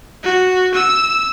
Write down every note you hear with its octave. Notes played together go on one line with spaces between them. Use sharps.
F#4
E6